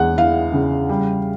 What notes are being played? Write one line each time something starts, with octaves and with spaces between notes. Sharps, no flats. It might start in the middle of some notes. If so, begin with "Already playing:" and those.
Already playing: E2 G#3 F#5
E3 F5
C#3
G3